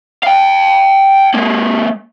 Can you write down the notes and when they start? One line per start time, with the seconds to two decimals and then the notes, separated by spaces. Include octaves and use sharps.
0.23 F5 G5
1.34 G#3 A#3